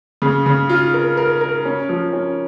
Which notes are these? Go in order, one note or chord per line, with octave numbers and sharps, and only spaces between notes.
C#3
C#3
F4
A#4
A#4
A#4
C#4
F3
C#4